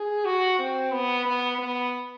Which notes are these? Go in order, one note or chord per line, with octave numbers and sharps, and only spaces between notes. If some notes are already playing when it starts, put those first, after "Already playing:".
Already playing: G#4
F#4
C4
B3
B3
B3